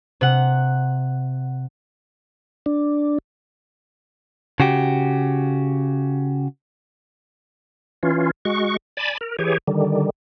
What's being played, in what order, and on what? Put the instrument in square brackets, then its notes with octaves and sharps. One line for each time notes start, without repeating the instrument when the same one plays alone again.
[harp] C3 F#5
[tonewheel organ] D4
[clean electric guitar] C#3 F#4 G4
[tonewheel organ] E3 C#4 F4
G#3 F#4 C#6
D5 G#5 A5 B5
A#4
E3 G4 G#4 C#5
D3 D#3 G3